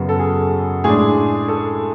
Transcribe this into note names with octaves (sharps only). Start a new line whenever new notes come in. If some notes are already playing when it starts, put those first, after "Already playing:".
Already playing: F#2 C#3 F#3 B3 F#4
A4
G#4
A2 G#3 D4 G#4
A4